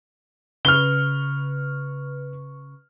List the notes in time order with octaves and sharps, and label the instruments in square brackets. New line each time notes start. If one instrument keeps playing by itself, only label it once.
[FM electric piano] C#3 B4 C#6 [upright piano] F6 G7